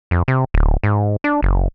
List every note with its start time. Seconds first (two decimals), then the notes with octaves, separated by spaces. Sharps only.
0.11 F2
0.28 C3
0.54 D1
0.83 G#2
1.24 D4
1.43 F#1